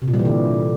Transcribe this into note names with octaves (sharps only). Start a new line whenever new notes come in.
C3
A#2
G3
E3
D3